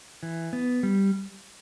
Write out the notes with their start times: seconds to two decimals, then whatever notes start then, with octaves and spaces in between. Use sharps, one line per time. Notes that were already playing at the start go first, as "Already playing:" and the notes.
0.23 E3
0.53 B3
0.83 G3